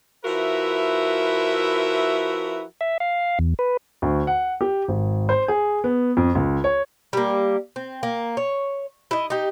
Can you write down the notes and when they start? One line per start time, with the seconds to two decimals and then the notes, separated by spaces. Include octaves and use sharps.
0.24 F3 E4 F#4 A#4 B4 E5
2.81 E5
3.00 F5
3.39 E2
3.59 B4
4.02 D2
4.27 F#5
4.61 G4
4.88 G#1
5.29 C5
5.48 G#4
5.84 B3
6.17 F2
6.35 C#2
6.64 C#5
7.13 G3 A#3
7.76 C4
8.03 A#3
8.37 C#5
9.11 E4 D#5
9.30 D#4 G4